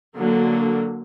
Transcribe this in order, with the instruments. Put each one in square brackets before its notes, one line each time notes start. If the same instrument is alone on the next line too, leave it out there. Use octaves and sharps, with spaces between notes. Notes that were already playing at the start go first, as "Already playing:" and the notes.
[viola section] D3 F#3 A#3